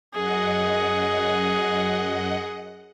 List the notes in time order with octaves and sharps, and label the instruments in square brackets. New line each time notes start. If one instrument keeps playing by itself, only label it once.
[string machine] F#2 D#5 F#5 [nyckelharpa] G#4